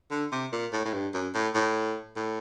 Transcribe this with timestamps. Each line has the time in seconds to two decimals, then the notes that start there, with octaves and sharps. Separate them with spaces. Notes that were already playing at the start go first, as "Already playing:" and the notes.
0.11 D3
0.32 C3
0.52 A#2
0.72 A2
0.85 A2
0.93 G2
1.13 F#2
1.34 A2
1.55 A2
2.16 A2